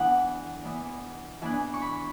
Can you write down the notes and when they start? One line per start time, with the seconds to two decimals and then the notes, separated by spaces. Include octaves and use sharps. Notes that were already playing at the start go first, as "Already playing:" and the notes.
Already playing: E3 B3 D4 D5 E5 F#5
0.64 E3 B3 D4
1.42 E3 B3 D4 G#5
1.74 C#6
1.82 B5